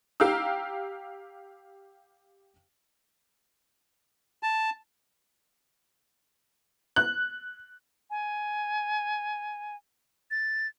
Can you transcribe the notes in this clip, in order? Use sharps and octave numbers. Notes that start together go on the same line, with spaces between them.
G4 F5 G5 A#5 E6
A5
F#6
G#5
A6